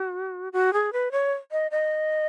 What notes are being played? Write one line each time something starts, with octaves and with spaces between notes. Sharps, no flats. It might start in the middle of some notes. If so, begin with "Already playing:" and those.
Already playing: F#4
F#4
G#4
B4
C#5
D#5
D#5